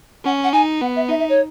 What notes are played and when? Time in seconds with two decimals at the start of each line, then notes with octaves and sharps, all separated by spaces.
0.25 C#4 F#5
0.43 F#5
0.53 D#4 G#5
0.81 B3 F#5
0.95 E5
1.09 D#4 E5
1.19 E5
1.29 C#5